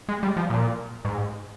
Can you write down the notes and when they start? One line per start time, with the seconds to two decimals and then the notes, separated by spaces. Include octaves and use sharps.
0.09 G#3
0.23 G3
0.37 F3
0.50 A#2
1.05 G#2